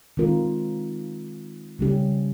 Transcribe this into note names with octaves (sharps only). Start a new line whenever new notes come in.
D#3 G#3 C4 F4 A#4
C#3 G3 C#4 G4